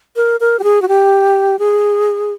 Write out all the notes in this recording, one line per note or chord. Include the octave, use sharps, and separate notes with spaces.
A#4
A#4
G4
G#4
F#4
G4
G#4